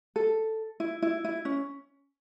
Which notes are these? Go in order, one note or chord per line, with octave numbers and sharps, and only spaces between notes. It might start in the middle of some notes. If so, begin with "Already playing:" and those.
A4
E4
E4
E4
C#4